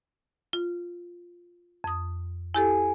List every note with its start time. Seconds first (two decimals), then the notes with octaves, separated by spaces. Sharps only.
0.53 F4
1.84 F2 D#6
2.54 E4 G4 A4 G#5